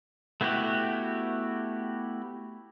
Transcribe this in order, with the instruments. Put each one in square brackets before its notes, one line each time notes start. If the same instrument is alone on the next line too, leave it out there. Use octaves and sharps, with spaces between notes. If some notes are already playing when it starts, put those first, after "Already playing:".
[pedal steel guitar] A3 B3 E4 F#4 G4